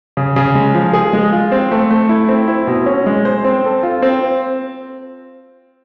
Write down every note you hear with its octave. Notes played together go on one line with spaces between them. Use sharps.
C#3
C#3
G#3
F3
G#4
G#3
F4
C4
A3
A3
E4
C4
E4
B2
C#4
G#3
C5
C4
A4
F4
C4